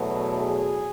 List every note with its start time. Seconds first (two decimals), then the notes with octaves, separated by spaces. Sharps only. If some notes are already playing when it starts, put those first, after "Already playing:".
Already playing: E2 B2 F#3 A3
0.37 G#4